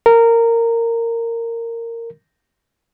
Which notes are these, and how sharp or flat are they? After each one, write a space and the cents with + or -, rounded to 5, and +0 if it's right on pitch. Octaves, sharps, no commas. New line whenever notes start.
A#4 -15